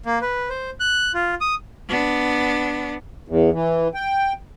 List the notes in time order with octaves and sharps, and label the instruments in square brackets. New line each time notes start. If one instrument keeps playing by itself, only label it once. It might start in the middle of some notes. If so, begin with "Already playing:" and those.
[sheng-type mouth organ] A#3
B4
C5
F#6
F4
D#6
[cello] B3 D4
[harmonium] E2
E3
G5